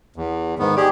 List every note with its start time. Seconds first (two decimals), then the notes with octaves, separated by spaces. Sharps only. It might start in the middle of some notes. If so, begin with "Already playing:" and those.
0.16 E2
0.59 G#2 D#3 B3
0.77 G4 G#4 D5 G5 D6